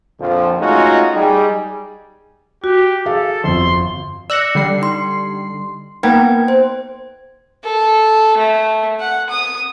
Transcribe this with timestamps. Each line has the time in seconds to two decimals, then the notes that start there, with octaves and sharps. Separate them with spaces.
0.21 A#1 F2 D3 F3
0.60 G#3 A3 C#4 D#4 F4 F#4
1.14 G3 D#4 G#4
2.64 F#4 G4
3.06 G#4 A4 F5
3.44 G1 F2 C6
4.30 D5 E6 F#6 A#6 C#7
4.55 D3 G3 C7
4.82 D#4 C6
6.03 A#3 B3 D#4 A#4 G5 G#6
6.48 C5
7.64 A4
8.37 A3
9.00 F#5
9.30 D#6